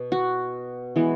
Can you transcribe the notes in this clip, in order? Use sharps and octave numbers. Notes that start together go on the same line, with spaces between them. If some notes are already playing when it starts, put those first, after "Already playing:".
Already playing: B2
F#4
E3 G#3 B3